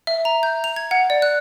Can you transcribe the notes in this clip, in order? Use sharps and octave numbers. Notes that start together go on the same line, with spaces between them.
E5
A#5
G6
F7
G#6
F#5
D5
F#6